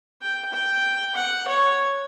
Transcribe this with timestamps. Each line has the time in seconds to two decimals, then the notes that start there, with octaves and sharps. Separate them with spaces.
0.22 G5
0.53 G5
1.15 F#5
1.48 C#5